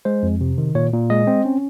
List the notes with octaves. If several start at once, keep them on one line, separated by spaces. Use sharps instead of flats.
G#3 C5
F2
C3
D#3
A#2 C#5
A#2
G#3 D#5
C4
C#4